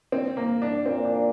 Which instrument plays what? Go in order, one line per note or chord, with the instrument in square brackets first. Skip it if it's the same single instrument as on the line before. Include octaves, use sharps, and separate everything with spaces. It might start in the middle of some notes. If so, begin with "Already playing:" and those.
[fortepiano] C4
A#3
D4
[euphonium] A#2 [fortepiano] C4
[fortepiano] D4